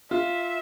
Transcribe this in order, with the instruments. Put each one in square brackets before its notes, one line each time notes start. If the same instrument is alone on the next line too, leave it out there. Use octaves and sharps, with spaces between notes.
[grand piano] F4 [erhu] E5